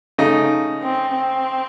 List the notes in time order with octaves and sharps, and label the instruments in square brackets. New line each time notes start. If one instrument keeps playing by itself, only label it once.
[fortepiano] C#3 A3 D#4
[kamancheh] C4
C4